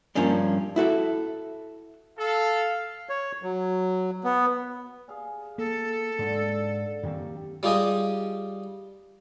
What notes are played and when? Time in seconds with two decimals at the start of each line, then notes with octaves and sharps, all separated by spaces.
0.15 G2 F3 A#3 C#4 D4
0.76 E4 F#4 A4 E5
2.19 A4 F5
3.09 C#5
3.43 F#3
4.24 B3
5.08 G#4 F5 G#5
5.58 A#3 A4
6.19 G#2 D3 G#3
7.03 F#2 D#3 A#3 C4 G4
7.63 G3 F4 G4 G#4 D#5